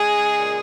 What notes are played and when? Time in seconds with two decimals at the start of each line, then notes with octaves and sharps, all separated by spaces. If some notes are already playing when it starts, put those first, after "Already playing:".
Already playing: C#3 G#3 G#4
0.39 A#2